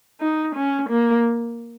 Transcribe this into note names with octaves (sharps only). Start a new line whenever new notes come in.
D#4
C#4
A#3